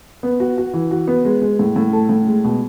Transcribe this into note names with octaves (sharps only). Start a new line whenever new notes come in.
B3
F#4
F#4
E3
F#4
B3
G#3
G#3
A2
A2
A4
A2
G#3
B2